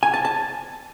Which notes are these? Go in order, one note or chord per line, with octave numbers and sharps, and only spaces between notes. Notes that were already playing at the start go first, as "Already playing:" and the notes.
G#5
A5
A5